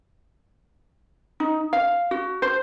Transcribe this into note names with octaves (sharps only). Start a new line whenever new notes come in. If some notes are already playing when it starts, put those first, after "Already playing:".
D#4
F5
F#4
C5